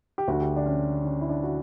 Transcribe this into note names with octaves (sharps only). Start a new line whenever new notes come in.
G4
D2 D3 F#4
G4
D4
C#4
C#4
E4
D4
F#4